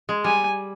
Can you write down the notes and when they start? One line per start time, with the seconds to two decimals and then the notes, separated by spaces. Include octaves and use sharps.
0.09 G#3
0.24 G3 G#5